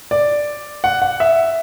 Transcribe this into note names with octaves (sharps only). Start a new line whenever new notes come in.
D5
F#5
F#5
E5